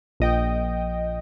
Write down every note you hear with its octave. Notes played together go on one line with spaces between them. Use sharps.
A#1 D#5 G5